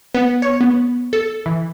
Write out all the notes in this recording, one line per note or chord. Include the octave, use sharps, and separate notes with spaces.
B3
C#5
B3
A4
E3